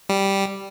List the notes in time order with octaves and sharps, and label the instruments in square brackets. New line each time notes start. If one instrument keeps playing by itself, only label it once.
[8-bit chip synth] G3